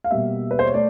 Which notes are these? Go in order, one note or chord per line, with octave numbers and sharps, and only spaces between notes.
F5
B2 G3 A#3 E5
B4
C5
C#5
A3 D5